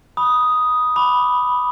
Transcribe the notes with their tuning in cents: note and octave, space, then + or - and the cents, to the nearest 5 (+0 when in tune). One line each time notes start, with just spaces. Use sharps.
B5 -10 D#6 +0
B5 +0 D6 +0